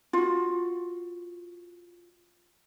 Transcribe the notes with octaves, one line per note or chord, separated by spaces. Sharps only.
F4 F#4